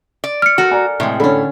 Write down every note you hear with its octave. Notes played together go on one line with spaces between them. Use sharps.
D5
F6 C#7
F#4 A4 A#4
D5 G#5 A#5
A2 C3 G#3
D3 C#4 A4 B5